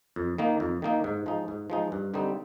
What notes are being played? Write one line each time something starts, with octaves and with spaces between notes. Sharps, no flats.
F2
D#3 A#3 D#4
F2
D#3 A#3 D#4
G#2
F3 G#3 D#4
G#2
F3 G#3 D#4
G2
D3 G3 C4 D#4